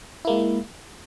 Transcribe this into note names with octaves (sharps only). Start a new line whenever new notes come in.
G#3 A#3 E4